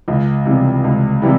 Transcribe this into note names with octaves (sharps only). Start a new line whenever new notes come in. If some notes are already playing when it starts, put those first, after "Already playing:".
C#2
C3 E3 G3
C#2
C3 E3 G3